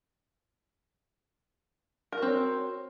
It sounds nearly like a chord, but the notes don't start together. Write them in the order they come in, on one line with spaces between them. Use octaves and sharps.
A#4 F#4 C4 C#5